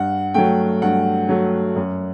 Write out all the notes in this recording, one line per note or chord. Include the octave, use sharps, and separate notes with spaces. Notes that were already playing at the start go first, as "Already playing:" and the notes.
Already playing: G2 F#5
F#3 A3 G5
G2 F#5
F#3 A3
F#2